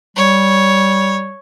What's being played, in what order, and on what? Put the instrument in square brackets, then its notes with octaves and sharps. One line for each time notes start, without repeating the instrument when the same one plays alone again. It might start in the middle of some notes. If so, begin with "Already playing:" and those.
[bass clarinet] G3 [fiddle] C#5